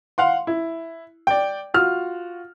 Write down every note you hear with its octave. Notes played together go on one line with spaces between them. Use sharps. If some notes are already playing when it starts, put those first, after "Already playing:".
F5 F#5 C6
E4
D5 G5
F4 F#4 F6